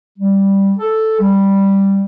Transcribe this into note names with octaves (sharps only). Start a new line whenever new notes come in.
G3
A4
G3